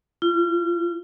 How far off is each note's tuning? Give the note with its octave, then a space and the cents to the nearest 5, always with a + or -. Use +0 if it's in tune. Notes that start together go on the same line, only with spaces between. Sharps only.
F4 -35